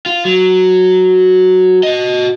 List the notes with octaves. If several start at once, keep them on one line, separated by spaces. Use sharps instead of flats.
F4
F#3
F#4 D#5